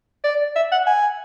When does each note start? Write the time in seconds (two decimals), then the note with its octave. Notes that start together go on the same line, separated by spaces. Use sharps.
0.24 D5
0.56 E5
0.71 F#5
0.86 G#5